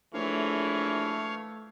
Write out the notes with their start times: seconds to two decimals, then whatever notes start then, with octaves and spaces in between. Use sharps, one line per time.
0.14 A#1 E3 A3 C#5 F5